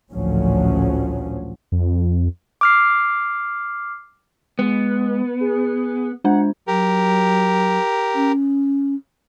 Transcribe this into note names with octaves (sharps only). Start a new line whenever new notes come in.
A1 D2 A#2 F3 F#3 C#4
F2
D6 F6 C7
G#3 B3
G#4
G#3 D4 C5 F#5
F#3 G4 A#4
C#4